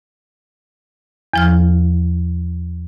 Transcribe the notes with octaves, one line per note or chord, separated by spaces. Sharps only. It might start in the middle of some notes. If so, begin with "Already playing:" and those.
E2 F3 F6